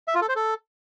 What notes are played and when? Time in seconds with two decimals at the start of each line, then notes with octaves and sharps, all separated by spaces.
0.08 E5
0.15 F4
0.22 A4
0.29 C5
0.36 A4